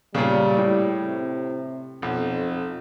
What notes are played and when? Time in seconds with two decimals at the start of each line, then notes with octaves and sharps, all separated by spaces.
0.15 A#2 C#3 G3
0.57 A2
1.05 C3
2.02 B1 F2